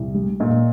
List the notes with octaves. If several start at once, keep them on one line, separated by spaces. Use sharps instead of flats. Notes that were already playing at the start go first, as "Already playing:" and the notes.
Already playing: C2
G3
A#2 D#5